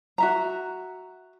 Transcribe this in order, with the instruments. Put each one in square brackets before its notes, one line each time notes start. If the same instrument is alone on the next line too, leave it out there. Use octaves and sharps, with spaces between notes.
[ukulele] F#4 E5 A#5